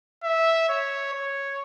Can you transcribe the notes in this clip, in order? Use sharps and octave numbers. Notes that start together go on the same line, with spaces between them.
E5
C#5
C#5